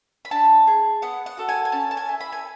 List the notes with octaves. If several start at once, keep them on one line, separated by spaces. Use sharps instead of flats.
B5
D4 A5
G#4
B3 F#5
F#5
F#4 A4
G#5
G#5
C#4 A5
A5
G#5
E4 A4
B5
G#5